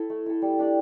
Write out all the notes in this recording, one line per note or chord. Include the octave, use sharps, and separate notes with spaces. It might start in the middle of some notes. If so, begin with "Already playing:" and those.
Already playing: E4 A4
A3
E4 A4
G3
D4 G4 D5